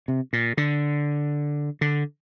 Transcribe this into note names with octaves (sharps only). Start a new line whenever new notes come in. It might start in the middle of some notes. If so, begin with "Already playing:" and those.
C3
A#2
D3
D3